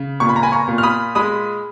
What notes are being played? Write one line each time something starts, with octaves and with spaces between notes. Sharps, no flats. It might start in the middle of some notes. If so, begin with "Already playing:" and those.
Already playing: C#3
A#2 C#6
B5
A#5
G#5 B5
A#5 C#6
A#2
F6
B5 D#6
G#3 B5 D#6